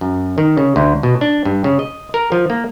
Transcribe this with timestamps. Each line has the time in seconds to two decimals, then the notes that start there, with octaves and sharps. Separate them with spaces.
0.01 F#2
0.38 D#3
0.57 C#3
0.76 D2
1.03 B2
1.21 D4
1.45 G2
1.64 C#3
1.79 D#5
2.14 A#4
2.32 F3
2.50 A#3